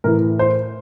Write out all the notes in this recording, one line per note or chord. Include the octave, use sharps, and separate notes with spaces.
A2 E3 A#4
C5